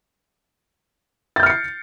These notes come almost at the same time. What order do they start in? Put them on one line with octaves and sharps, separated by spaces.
A6 G6 F6 C#7 C7